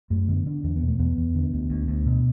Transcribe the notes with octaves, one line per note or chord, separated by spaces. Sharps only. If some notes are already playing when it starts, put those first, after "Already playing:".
F#2 A3
D3 B3
D3 D4
E2 D4
B3
B2
A3
E2 B3
E2
D3
D2
D2
D2
B2